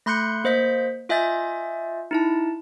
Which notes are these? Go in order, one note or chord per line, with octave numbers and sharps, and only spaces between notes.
A3 B5 C6 F#6 G6 C#7
A#3 C5 D#5 G6 B6
F4 D#5 E5 G#5 G6 A6
D#4 E4 A5